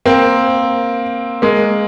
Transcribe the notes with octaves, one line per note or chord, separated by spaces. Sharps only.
A#3 C4
G#3 A#3